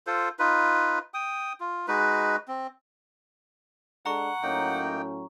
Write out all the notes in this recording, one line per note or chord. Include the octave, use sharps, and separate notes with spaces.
F4 A4 C5
D#4 F4 B4
G5 D#6
F4
G#3 D#4 F#4 B4
C4
G#3 D4 A4 F#5 A#5 C#6
A2 F#3 A#3 C#4 D#4 G5